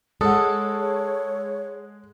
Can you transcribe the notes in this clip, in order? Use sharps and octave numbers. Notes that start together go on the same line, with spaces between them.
G#3 A4 C#5 F#5 D#6